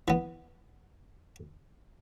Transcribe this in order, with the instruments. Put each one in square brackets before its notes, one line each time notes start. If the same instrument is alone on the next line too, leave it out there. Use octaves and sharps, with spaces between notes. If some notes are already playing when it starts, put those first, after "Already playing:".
[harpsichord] E3 B3